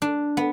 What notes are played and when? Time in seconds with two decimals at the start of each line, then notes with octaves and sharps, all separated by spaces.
0.02 D4
0.37 B3